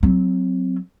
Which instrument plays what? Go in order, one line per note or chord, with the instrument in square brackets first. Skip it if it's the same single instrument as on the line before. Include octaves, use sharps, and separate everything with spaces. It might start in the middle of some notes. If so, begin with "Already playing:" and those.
[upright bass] F#3 C4